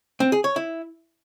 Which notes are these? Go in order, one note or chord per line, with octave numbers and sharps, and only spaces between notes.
C4
G#4
C#5
E4